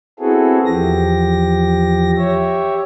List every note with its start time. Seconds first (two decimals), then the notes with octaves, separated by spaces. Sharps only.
0.19 B3 C4 E4 F#4 G#4 A4
0.66 E2 F3 G4 A#6
2.17 G4 C#5 E5